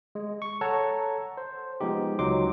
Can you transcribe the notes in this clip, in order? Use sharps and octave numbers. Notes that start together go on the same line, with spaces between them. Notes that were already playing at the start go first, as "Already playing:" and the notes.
G#3
C#6
A4 C#5 F#5 A5 A#5
C5
F3 G#3 B3 D#4 G4
C#2 F#3 D#4 C6 D6